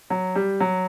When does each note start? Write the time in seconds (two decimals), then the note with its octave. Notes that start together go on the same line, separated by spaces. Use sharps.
0.10 F#3
0.35 G3
0.60 F#3